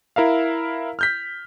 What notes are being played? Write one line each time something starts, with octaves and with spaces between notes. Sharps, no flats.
E4 A#4 E5 F5
F6 G6 B6